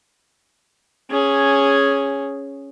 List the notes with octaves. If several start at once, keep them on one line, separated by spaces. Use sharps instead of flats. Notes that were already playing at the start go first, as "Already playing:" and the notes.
C#4 G#4